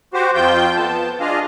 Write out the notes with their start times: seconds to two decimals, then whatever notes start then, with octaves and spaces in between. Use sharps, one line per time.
0.14 F#4 G4 C5
0.35 F2 F3 F4 G5 G6
0.77 B3 A5
1.20 D4 F4 G#4 D#5 F5